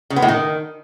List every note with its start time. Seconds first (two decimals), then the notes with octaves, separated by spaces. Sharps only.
0.10 C#3
0.16 B3
0.22 A2
0.28 D#3